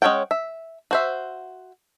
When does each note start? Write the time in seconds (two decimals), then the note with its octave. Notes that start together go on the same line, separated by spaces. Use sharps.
0.02 G#3 C#4 C#5 F#5 G5
0.31 E5
0.91 F#4 C5 E5